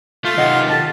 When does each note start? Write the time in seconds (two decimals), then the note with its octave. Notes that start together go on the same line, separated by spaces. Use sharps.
0.25 A3 F4
0.38 D#2 C3 D#5 F#5
0.70 G4 A4 A5